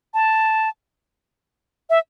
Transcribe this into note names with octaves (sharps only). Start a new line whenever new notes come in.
A5
E5